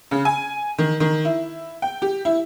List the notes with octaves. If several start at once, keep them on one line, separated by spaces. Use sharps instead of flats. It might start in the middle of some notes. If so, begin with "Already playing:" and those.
C#3
G#5
D#3
D#3
E4
G5
G4
E4